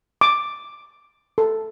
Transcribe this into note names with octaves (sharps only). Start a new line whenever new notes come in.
D6
A4